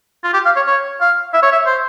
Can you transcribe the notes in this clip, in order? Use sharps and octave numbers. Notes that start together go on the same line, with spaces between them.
F4
G4
F5
C#5
C#5
F5
E5
C#5
E5
C5